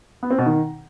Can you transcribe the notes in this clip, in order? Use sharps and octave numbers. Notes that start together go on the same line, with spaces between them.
B3
C4
B2
D#3